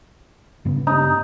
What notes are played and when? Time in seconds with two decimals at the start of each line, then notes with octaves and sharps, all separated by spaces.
0.65 G2 C#3 B3
0.87 D#4